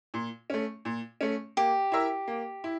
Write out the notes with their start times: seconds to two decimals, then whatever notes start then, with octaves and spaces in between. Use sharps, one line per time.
0.14 A#2
0.50 A3 C#4
0.85 A#2
1.21 A3 C#4
1.57 A#3 G4
1.92 E4 A#4 E5
2.28 A#3
2.64 E4